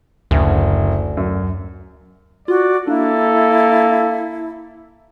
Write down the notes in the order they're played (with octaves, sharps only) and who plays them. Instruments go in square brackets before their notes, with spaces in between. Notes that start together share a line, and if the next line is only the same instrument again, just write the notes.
[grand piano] F#1 [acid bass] D2
[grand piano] F#2
[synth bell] F4 [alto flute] F#4 [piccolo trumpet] D5
[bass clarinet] A#3 [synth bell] D4 [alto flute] E4 [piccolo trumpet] A4